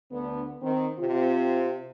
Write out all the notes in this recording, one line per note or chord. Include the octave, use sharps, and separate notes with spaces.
D2 D3 B3
D#3 C4
C3 C4 F4